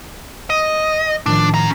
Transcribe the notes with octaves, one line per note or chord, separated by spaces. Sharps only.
D#5
A2 D#3 F3 D4
C#4 A#5